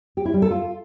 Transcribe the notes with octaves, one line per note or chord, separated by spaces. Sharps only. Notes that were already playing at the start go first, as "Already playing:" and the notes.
G4
E4
G3
A4
F4